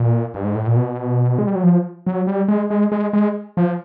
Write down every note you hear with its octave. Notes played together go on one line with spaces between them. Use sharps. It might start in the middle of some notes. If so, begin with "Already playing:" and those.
Already playing: A#2
G2
G#2
A2
A#2
B2
G#3
G3
F#3
F3
F#3
G3
G#3
G#3
G#3
G#3
F3